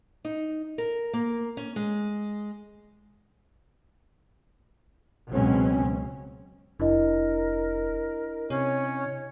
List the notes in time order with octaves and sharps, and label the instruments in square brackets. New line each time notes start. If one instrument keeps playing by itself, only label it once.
[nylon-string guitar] D#4
A#4
A#3
C#4
G#3
[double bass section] C#2 B2 F#3 C4 C#4
[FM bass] F1 [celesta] D4 E4 D#5 [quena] A#4
[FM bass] C3 [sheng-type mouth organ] C#4 [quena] C#5